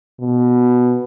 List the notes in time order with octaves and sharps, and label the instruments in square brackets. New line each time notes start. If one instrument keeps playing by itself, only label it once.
[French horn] B2